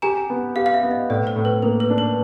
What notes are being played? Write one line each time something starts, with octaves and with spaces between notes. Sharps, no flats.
G4 G#5 A#5
B3
G4 F5
F5
E5
B3
D#5
A2 D5
C5
A2
B4
A#3 A#4
B4
D4
B4